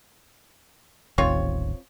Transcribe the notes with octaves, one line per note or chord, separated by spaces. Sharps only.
D#1 A1 D#2 C4 F4 C#5